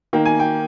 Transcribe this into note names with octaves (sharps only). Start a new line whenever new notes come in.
D#3 A#3 G5
G#5
G5